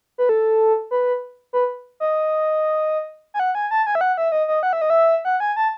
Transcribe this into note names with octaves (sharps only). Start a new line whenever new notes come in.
B4
A4
B4
B4
D#5
G#5
F#5
G#5
A5
G#5
E5
F#5
E5
D#5
D#5
F#5
E5
D#5
E5
F#5
G#5
A5